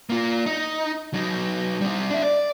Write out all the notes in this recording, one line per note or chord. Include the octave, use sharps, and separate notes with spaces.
A#3 F4
D#4
F#3 D#4
G3 C4
D4 E5
D5